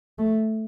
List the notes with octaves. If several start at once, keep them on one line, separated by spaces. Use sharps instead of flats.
A3